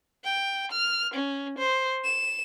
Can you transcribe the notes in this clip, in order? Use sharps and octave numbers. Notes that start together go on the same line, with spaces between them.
G5
F6
C#4
C5
E7